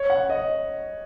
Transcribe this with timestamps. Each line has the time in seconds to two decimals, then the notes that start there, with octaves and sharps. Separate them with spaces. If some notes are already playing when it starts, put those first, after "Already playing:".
Already playing: C#5
0.10 F#5
0.29 D#5